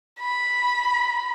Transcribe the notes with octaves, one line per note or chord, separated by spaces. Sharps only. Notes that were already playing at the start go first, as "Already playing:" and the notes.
B5